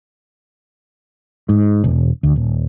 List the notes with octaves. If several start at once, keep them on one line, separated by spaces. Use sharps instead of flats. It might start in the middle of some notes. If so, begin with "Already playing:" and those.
G#2
E1
D2
D#1